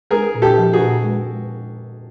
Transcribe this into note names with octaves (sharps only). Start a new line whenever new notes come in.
G#3 G#4 A#4
A#2
G4 A4
F3
F#4 G#4
A#2
G#3